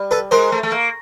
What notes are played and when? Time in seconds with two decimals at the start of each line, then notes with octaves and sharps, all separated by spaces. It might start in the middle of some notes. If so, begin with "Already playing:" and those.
Already playing: G3
0.11 A4 B4
0.31 G#3 A#4 C5
0.52 A3
0.63 A3
0.72 A#3